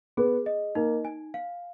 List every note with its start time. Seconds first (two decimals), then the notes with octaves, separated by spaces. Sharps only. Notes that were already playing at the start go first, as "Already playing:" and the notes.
0.17 B3 G#4
0.46 D#5
0.75 A#3 D#4
1.05 G#5
1.34 F5